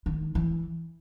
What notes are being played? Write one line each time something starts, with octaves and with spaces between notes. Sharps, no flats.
D#3
E3